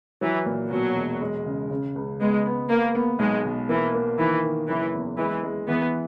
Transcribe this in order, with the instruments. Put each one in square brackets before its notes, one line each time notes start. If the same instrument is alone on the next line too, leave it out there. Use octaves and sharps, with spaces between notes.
[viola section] E3 [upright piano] F#3
[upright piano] A#2
[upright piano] B2 [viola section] F#3
[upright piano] E1
G#3
C#3
C#3
C#2
[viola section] G#3 [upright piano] B3
[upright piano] B3
[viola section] A#3 [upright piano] B3
[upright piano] B3
[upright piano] B1 [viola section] G#3
[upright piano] B2
[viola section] E3 [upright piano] A#3
[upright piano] A#3
[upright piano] D#3 [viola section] E3
[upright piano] D#3
[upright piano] F#1 [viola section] E3
[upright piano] E2
[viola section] E3 [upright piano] G#3
[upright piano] G#3
[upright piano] E3 [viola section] B3